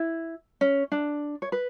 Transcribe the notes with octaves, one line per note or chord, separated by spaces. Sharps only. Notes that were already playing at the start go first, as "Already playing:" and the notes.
Already playing: E4
C#4
D4
C#5
B4